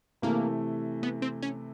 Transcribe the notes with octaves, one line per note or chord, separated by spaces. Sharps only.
C3 E3 A3 A#3
B3
C4
C#4